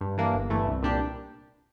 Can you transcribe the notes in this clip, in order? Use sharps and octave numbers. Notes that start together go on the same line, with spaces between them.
G2
E3 A#3 D4
G1
G2 E3 A3 E4
C2
A#2 G3 D4 G4